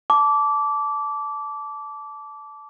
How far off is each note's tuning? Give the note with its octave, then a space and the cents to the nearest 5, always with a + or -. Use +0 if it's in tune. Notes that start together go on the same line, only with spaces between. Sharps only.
A5 -15 D6 -20